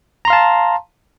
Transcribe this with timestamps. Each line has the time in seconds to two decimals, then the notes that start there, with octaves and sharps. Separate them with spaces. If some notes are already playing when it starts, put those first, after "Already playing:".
0.25 A#5
0.28 C6
0.30 F5
0.33 A5